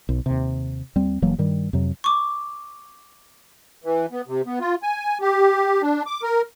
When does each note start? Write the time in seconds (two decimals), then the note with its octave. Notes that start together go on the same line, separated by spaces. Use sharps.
0.09 B1
0.26 D#2 C3
0.95 D#2 G3 C4
1.22 F#1 E3 F#3 A#3
1.38 G2 D#3 G3
1.73 F2 C3 F#3
2.04 C#6 D6
3.84 E3
4.12 B3
4.27 C3
4.46 B3
4.60 F4
4.83 G#5
5.21 G4
5.82 D4
6.06 D6
6.23 A#4